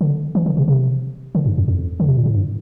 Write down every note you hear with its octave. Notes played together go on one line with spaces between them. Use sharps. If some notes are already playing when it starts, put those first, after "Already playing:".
D3
E3
D3
C3
C3
D3
G2
F2
F2
D3
C3
A#2
A2
G2